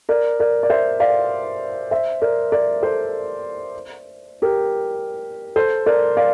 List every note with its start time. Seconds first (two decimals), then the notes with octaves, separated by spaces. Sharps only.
0.09 A#4 D5
0.40 A#4 D5
0.63 D5
0.70 C5 E5
1.00 D5 F5
1.91 C5 E5
2.22 A#4 D5
2.52 A#4 D5
2.82 A4 C5
4.42 G4 A#4
5.56 A4 C5
5.86 A#4 D5
6.17 D5 F5